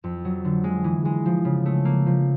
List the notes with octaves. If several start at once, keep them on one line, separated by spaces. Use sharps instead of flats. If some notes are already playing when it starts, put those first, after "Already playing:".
F2
F#3
D3
G#3
E3
G#3
F3
C#3
A3
A#3
F3